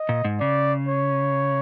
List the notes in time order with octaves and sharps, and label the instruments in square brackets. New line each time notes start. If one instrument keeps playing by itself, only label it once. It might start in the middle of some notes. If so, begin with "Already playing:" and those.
Already playing: [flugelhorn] D#5
[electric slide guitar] A#2
G#2
[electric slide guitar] C#3 [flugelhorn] D5
[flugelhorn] C#5